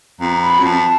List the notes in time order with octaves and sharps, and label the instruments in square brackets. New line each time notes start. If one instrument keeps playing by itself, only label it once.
[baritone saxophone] F2 [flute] A#5
[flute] B5
[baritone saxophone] F#2
[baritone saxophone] F2 [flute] A5